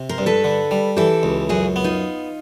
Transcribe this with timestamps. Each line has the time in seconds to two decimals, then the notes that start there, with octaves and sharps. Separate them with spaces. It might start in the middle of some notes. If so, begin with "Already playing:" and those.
Already playing: C3
0.09 A#4 C5
0.18 G2
0.26 A4 B4
0.44 D3
0.71 G3
0.96 E3 G4 A4
1.23 C#2
1.49 F#2 F#4 G#4
1.76 B3
1.84 D#4 F4